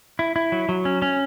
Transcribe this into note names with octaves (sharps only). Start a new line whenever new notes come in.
E4
E4
F#3
F#3
C#4
C#4